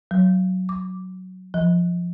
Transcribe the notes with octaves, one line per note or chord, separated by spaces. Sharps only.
F#3
D6
F3